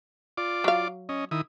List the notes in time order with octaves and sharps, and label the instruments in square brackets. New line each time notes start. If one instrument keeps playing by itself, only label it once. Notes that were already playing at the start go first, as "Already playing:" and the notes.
[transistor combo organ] F4 D5 D6
[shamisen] F#3 F5
[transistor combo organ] C#4 D#5
D#3 E4 D#6